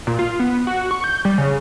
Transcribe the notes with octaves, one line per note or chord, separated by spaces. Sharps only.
A#2
F4
B3
F#4
C#6
G6
G3
C#3